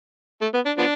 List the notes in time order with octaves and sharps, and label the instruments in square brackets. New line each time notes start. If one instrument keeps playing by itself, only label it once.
[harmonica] A3
B3
D4
F3 B3 D4